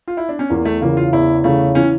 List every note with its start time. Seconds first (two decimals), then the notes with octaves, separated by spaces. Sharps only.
0.08 F4
0.17 E4
0.29 D4
0.39 C#4
0.50 E2 A#3
0.65 A3
0.81 C#3 E3 A#3
0.97 F4
1.13 E2 E4
1.44 C#3 E3 A3
1.75 E3 C#4